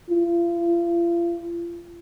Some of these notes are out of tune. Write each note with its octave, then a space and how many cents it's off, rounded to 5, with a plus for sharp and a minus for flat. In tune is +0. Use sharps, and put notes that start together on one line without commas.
F4 -40